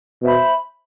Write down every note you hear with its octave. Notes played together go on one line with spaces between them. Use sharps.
B2 C5 E5 B5